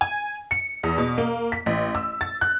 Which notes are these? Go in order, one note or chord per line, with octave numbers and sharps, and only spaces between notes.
G#5
C#7
E2
B2
A#3
B6
A1
E6
A6
F#6